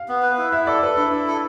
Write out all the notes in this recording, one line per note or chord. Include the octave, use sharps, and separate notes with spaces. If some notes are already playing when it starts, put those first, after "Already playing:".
Already playing: F5
B3
B4
E4
E4 E5
A4 D5
A4 B4
D4 E4
E4
A4